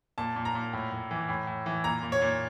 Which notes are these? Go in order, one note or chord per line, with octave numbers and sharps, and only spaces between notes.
A#2 A5
A#2
A#5
A#2
A2
A2
E3
A2
A2
E3
A#2 A#5
A#2
C#5
A#2